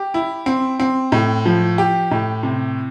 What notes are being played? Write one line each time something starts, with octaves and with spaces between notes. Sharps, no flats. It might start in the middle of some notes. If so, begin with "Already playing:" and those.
Already playing: G4
E4
C4
C4
A2
F3
G4
A2
C3